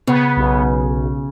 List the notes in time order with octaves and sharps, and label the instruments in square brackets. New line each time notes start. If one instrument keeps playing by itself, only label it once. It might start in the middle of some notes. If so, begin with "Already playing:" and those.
[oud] C#3 [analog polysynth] B3
[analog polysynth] B1